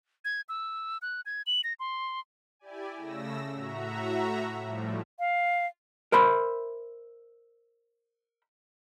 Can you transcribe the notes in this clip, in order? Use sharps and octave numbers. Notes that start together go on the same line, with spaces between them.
G#6
E6
F#6
G#6
F#7
A#6
C6
E4 G4 D5 G#5
C#3 A3 E6 A#6
A2 F#4 E5 A#5
A2 F3 G3 A3
F5
A#4 C5 E5 B5 C6